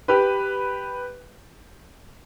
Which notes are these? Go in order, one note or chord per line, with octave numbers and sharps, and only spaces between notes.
G4 B4